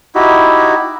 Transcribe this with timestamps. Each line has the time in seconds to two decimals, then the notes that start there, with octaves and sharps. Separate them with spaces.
0.15 D#4 E4 F#4 G4